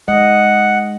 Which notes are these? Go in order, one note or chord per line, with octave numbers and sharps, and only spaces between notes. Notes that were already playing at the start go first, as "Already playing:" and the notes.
G#3 D#5 F#5